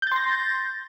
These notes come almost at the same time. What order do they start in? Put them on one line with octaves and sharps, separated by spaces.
G6 A6 C6 A#6